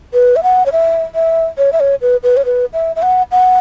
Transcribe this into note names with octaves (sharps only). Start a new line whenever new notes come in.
B4
E5
F#5
C#5
E5
E5
C#5
E5
C#5
B4
B4
C#5
B4
E5
E5
F#5
F#5